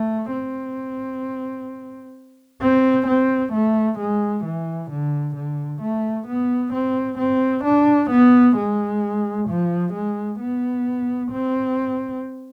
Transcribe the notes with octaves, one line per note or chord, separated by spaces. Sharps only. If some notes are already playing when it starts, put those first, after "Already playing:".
Already playing: A3
C4
C4
C4
A3
G#3
E3
D3
D3
A3
B3
C4
C4
D4
B3
G#3
F3
G#3
B3
C4